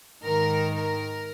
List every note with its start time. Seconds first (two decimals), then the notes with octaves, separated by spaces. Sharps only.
0.23 G#2 D#3 A#4
0.75 A#4